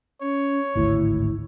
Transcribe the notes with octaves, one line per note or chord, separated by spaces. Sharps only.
C#4 C#5
G#1 D2 A2 E4